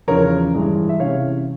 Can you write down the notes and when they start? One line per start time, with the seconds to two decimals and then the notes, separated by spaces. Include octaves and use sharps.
0.07 E2 C#3 F3 A#4 C#5
0.54 G2 E3 G#3
0.89 E5
1.00 C3 E3 G#3 C#4 C#5 F5